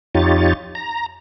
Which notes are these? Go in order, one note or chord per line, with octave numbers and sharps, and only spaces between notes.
F2 D#4 F4 G4 C#5 A6
A#5